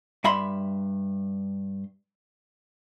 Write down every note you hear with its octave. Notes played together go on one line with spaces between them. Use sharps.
G2 E5 B5 C6